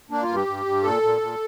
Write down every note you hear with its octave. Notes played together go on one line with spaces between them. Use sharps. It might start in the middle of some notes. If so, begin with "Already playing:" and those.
A#3 D4
F4
G2
G4
G2
G2
A#2 A4
A#2
A#2